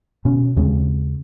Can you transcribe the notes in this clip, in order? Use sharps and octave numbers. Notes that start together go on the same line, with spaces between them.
B2 C#4
D#2 C#3 G#3 C4